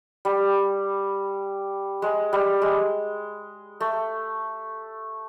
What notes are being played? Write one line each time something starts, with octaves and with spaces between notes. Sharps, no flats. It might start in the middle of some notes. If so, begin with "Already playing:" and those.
G3
G#3
G3
G#3
A3